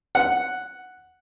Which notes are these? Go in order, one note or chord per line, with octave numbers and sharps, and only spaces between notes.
F#5